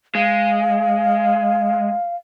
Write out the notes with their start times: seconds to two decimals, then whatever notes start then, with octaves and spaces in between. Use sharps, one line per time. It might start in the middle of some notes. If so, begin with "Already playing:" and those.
0.15 G#3 F5